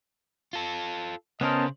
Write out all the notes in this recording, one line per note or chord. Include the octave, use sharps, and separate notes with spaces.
F4 A4
C#3 B3 C#4 A#4 C5 D#5 A5